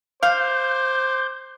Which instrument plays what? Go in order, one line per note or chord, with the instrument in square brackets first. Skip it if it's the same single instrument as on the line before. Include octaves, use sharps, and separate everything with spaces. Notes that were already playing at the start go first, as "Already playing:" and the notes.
[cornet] C5 [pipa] F5 [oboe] D6 [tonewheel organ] G6